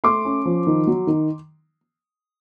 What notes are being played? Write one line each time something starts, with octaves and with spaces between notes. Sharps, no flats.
A3 C6 D6
C#4
F3
D#3
F#3
D#3